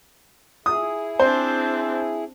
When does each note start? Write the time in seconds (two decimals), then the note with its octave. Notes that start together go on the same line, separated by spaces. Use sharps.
0.66 E4 G#4 D#6
1.19 C4 D4 C5